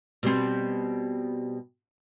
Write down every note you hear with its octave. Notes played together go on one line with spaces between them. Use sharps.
B2 G3 C4